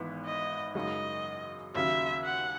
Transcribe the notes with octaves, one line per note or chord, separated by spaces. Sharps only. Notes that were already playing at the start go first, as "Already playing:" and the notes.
Already playing: G#1 G#2 E3 B3 E4
D#5
F#2 C#3 G#3 D#4 F#4 D#5
D#2 C#3 F#3 C#4 E5
F#5